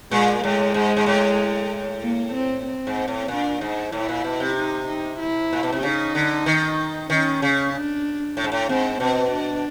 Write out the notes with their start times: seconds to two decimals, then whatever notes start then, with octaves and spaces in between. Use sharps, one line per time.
0.11 A#2 G#3
0.43 A2 G#3
0.74 G#2
0.96 G#2
1.06 A2
2.01 A#3
2.33 C4
2.65 C4
2.87 G#2
3.08 A2
3.28 A#2 D4
3.61 G#2 D#4
3.92 A2 E4
4.09 A#2
4.24 B2
4.40 C3
4.56 D#4
4.88 D#4
5.19 E4
5.53 A#2
5.63 B2
5.72 C3
5.83 C#3 D#4
6.15 D3
6.46 D#3
7.09 D#3 C#4
7.42 C#3
7.74 D4
8.37 A2
8.44 G#2
8.52 A2
8.69 G#2 C4
9.00 B2 C4
9.32 D4